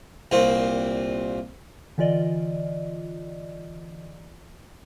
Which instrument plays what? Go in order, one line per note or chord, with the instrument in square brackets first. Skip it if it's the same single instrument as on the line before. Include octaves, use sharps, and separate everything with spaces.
[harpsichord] C2 A#2 C4
[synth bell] D3 E3 F4 D5 D#5